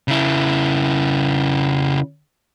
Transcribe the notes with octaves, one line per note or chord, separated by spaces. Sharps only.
C#3 E4